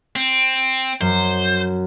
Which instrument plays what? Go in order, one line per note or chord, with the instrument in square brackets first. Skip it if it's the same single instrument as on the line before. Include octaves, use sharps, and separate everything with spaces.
[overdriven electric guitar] C4
[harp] F#2 [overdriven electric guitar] C5